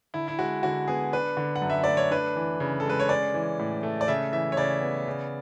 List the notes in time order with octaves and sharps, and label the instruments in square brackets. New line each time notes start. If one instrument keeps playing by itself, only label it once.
[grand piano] D3 E4
E4
G#3 F#4
D3 F#4
B3 G#4
D4 B4
D3
F#5
F#2
E5
A3 D5
C#5
D4 B4
E3
C#3
A4
G#3 B4
C#5
C#4 D5
E3
A2
A3
D5
C#3 E5
E3 E5
C#5
C#3 D5
B3
C#3